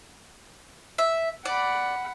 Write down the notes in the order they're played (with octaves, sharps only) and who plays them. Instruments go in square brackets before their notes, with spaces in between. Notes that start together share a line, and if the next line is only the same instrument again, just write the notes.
[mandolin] E5
[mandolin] D5 [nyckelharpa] F#5 B5